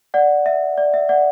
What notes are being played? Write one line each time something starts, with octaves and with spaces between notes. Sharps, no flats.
D5 F#5
E5
D5
E5
D5 F#5